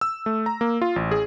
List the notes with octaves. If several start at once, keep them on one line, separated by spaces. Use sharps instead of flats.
E6
A3
A#5
A#3
F4
A1
G#4